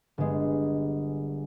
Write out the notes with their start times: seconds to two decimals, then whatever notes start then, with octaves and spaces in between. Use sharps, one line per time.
0.18 G1 G#3